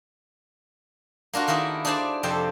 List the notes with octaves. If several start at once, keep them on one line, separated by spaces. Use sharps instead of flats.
A#3 D4 F4 F#4
D#3 A#3 E4 G#4 B4
D4 G#4 B4 C5 D5 A5
F2 C3 C4 A4 G5